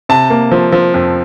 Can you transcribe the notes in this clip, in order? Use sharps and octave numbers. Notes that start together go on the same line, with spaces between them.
C3 A5
A#3
F3
F3
F2